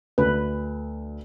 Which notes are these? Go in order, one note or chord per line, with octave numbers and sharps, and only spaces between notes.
D2 B4